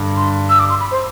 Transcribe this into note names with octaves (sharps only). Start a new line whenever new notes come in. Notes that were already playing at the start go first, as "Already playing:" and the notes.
Already playing: G2 D3
C6
E6
D6
C6
B5
C5